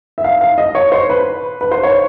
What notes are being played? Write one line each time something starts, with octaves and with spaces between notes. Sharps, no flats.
E5
F5
F5
D#5
C#5
C5
B4
B4
C5
C#5